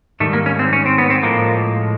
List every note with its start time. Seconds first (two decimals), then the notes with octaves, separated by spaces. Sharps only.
0.20 G#2 D#3 G3 A3
0.33 A#3
0.46 C#4
0.59 C4
0.73 C#4
0.86 C4
0.98 B3
1.10 C4
1.23 A2 F3 G#3 A#3